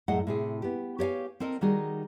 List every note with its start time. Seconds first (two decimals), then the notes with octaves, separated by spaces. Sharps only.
0.08 F#2 A2 A3 G#4 D#5 F#5
0.27 A2 C3 G#4
0.62 B3 G4
0.99 G4 C#5 D5 F5 G#5
1.40 C4 A4 A#4 D#5
1.61 D#3 G3 D#4 F#4 G#4